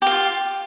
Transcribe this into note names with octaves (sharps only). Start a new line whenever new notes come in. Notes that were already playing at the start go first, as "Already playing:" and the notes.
F4 G4 F5